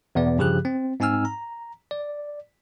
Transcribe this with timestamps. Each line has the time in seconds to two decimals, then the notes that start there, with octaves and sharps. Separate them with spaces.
0.15 E2 B2 B3 D5
0.38 G2 C#3 F3 G4 G#4 F#6
0.65 C4
1.00 G#2 C4 D#4 G#5 E6 F6
1.25 A#5
1.91 D5